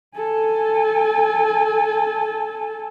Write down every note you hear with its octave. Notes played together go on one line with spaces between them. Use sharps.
A4 G#5